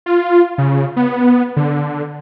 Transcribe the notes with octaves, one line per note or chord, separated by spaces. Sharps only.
F4
C#3
B3
D3